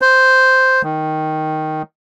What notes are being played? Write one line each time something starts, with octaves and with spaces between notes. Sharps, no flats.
C5
D#3